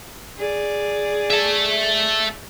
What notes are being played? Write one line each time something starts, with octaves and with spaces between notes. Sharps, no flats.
G#4 D5
E5 A5